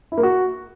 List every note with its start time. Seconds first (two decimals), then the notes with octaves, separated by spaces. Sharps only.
0.12 E4
0.18 A#3
0.23 F#4